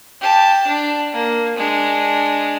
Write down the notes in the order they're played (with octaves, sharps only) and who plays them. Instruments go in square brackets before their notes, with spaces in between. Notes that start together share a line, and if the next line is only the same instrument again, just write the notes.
[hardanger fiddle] G4 A5
D4
A#3
G#3 D4